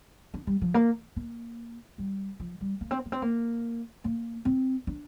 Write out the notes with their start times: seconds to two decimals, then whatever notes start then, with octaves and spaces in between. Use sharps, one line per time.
0.34 D4
0.47 G3
0.61 F3
0.74 A#3
1.16 A#3
1.98 G3
2.40 F3
2.61 G3
2.81 A#3
2.91 C4
3.05 A#3
3.12 C4
3.22 A#3
4.04 A#3
4.45 C4
4.87 D4